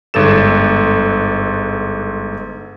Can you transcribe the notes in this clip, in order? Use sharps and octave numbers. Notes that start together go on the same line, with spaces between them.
G1 G#2 A4 E7